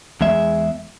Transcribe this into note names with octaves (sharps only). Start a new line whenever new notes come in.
E2 G#3 E5